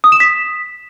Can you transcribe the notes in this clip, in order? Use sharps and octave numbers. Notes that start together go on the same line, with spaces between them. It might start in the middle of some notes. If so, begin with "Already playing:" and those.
D#6
E7
B6